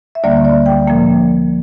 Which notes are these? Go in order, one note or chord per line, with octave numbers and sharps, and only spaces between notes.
E5
D2 D3 G3 A#3 D5
D5
G5
A#2 F3 A#3